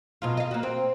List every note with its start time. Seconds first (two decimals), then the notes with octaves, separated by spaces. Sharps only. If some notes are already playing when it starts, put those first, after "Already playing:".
0.22 B2 F#3 F4
0.37 D#5 F5
0.51 A#3 F#4
0.63 C4